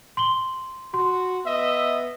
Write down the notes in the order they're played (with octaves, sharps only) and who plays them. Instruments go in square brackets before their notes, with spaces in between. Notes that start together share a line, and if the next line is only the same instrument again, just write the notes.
[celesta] C6 F#7 G7
[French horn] F#4 [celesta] C6
[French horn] B3 [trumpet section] D#5 E5